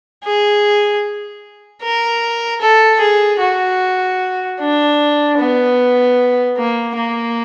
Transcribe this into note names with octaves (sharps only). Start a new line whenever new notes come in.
G#4
A#4
A4
G#4
F#4
D4
B3
A#3
A#3